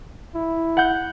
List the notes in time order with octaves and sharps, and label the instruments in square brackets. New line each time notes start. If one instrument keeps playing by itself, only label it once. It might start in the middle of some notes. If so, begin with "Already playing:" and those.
[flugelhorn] E4
[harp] F#5 G6